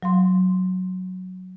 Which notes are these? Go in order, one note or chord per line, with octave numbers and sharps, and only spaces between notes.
F#3 F5 C6